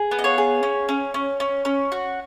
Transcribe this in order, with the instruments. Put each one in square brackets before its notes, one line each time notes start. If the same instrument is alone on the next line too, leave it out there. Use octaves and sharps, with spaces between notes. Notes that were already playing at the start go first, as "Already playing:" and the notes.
Already playing: [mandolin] G#4
B3
D#5
C#5 F5
G#4
C#4
C#4
C#4
C#4
C#4
F#4